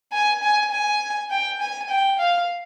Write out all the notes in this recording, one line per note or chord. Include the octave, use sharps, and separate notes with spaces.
G#5
G#5
G#5
G5
G#5
G5
F5